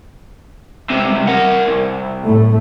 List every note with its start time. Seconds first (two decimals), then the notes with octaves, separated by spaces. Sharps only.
0.90 C#2 C3
1.27 A#4 F#5
1.67 C2
2.25 A2 A3